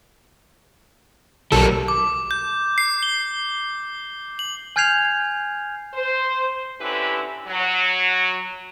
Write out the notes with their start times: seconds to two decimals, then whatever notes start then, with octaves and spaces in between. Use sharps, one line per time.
1.52 B1 G3 A#3 A4
1.88 D6
2.31 G6
2.78 C7
3.03 G7
4.39 F#7
4.76 G#5 F6 G6 G#6 C7 F7
5.94 C5
6.80 D3 C4 C#4 E4 G4 B4
7.47 F#3